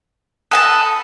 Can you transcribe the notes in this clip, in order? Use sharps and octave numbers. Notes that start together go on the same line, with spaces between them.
A4 G#5 A5 B5 D#6 F#6